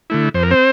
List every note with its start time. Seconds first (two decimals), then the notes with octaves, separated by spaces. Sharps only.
0.10 D3 A3 E4
0.34 F2 C5
0.43 A#4
0.51 C4 C5